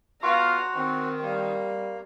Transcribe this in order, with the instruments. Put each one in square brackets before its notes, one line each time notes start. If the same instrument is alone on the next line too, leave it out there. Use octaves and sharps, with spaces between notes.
[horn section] B3 F4 F5 [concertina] F#4 [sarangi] A#5 [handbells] C6 C#6
[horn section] D#3 [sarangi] C4
[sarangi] G3 [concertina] A#3